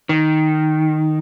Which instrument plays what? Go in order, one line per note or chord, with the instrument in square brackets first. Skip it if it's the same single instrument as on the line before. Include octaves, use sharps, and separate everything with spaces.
[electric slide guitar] D#3